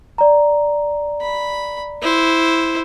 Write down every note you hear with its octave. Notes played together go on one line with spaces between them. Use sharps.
D5 A#5
B5
E4 C5